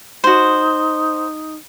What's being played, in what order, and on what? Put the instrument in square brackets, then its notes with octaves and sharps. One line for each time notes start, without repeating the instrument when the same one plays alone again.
[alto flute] D#4 [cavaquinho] F#4 C5